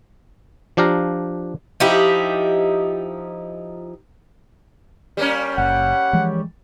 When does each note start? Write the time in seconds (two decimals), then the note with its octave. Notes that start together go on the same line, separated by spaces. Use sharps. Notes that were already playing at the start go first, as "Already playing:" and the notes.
0.77 F3 D4 G4 F5 A#5
1.80 F3 D#4 E4 G4
5.17 G3 A#3 C#4
5.58 F#1 F#5
6.13 E3 F3 G#3